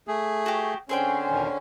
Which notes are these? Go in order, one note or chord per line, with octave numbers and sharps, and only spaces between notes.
A3 G#4
F#4 G4
D3 C4 C#4 G#4 C5 G5
E2 B2 D#3